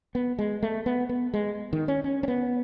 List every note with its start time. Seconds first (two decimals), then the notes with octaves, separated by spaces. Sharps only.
0.15 B3
0.39 G#3
0.63 A3
0.86 B3
1.09 B3
1.34 G#3
1.73 D#3
1.88 C#4
2.04 C#4
2.23 C#4
2.28 B3